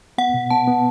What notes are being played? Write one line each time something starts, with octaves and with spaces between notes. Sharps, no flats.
B3 F#5
B2
B3 A5
B3